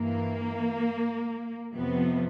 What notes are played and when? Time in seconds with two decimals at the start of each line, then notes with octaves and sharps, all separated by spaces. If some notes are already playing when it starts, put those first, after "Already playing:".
Already playing: G2 E3 A#3
1.76 F2 C3 F3 B3